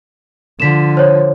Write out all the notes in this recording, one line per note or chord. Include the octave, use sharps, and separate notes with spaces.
D3 F3 B6 E7
C5 C#5